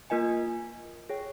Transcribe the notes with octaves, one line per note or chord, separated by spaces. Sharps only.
A#3 F4 A#4 D#5 G#5
G#4 C#5 G5